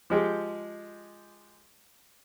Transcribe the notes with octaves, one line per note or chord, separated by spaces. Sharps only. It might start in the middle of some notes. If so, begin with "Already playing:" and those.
F3 G#3 G4